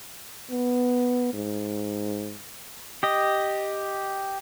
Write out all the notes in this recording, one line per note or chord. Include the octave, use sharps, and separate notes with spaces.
B3
G#2
G4 D#5